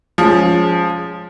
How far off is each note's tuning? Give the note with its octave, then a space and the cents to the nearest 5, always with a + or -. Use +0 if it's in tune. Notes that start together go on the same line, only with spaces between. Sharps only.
F3 +5 G#3 +0 C#4 +20